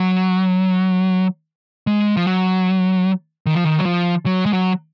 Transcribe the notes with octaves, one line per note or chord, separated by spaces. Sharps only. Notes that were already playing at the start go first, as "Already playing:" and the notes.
Already playing: F#3
G#3
F3
F#3
D#3
F3
D#3
F#3
F3
F#3
G#3
F#3